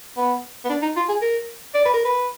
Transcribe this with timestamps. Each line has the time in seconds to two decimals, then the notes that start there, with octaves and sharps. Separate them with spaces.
0.17 B3
0.65 B3
0.69 D4
0.82 D#4
0.96 F4
1.08 G#4
1.22 A#4
1.74 D5
1.85 B4
1.94 A#4
2.05 B4